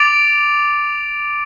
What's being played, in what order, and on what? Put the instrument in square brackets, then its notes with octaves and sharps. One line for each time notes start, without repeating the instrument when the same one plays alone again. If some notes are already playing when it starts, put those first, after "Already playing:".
Already playing: [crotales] D6 A6 D7 F7